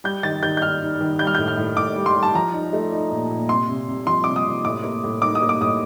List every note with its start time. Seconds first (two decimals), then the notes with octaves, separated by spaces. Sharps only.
0.04 G3 G6
0.23 D#3 A6
0.43 D#3 G6
0.57 G6
0.61 D#4 F6
0.82 D#4
1.01 D#3
1.19 G3 G6
1.27 F6
1.35 G6
1.38 A2
1.48 F6
1.57 A2
1.77 A2 D6
1.96 G3
2.06 C6
2.16 G3
2.23 A5
2.35 F3 A#5
2.54 D#4
2.73 A3
2.92 D#4
3.12 A#2
3.31 A#2
3.49 C3 C6
3.69 C3
3.88 C3
4.07 F3 C6
4.24 C3 D6
4.36 D#6
4.46 C3
4.65 A2 D6
4.84 A#3
5.04 A2
5.22 D#4 D6
5.35 D#6
5.42 A#3
5.49 D6
5.61 A2 D#6